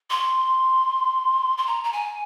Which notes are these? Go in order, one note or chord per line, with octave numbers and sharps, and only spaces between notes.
C6
C6
A#5
A#5
G#5